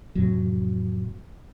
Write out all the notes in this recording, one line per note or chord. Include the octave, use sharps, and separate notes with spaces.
F2 A2 C3 F#3